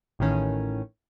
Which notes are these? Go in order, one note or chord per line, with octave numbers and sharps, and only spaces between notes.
A1 A2 D#3 C#4